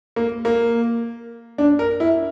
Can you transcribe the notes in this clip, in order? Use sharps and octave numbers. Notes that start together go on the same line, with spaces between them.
A#3
A#3
D4
A#4
E4